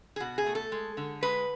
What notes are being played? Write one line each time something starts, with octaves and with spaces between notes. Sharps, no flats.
G#4
B2 F#4
G#4
A3
A4
G#3
D3
G#3 B4